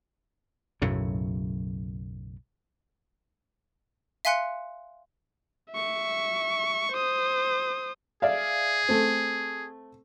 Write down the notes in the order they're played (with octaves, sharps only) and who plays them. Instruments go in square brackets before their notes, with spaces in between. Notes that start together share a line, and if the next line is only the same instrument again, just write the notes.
[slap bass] B1 F#2 A2 C#3
[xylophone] E5 F5 G#5 C6 F#6 C#7
[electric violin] E5 C#6
C5 D#6
[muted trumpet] G#4 [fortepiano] D5 E5 F5
[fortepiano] A3 C4